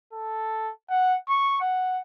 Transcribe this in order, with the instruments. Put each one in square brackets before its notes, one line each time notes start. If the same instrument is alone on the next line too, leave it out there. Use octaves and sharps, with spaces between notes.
[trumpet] A4
F#5
C#6
F#5